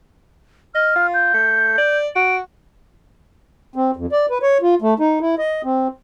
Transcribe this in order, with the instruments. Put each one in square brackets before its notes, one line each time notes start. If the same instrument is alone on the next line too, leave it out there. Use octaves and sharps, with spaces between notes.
[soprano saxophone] D#5 [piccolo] F6
[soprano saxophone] F4
[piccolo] G6
[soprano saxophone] A3
D5
[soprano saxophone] F#4 [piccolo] D7
[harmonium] C4
F2
D5
B4
C#5
F4
A3
D#4
E4
D#5
C4